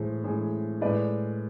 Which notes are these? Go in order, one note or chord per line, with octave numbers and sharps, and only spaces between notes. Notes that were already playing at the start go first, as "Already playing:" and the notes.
Already playing: A2 E3 G#3 C5
A2 E3 G#3
A2 G#3 B4 D5